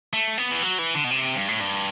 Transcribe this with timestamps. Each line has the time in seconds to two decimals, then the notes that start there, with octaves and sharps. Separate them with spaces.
0.13 A3
0.38 B3
0.51 E3
0.63 F#3
0.79 E3
0.95 D3
1.04 B2
1.11 C3
1.36 G2
1.48 A2
1.60 G2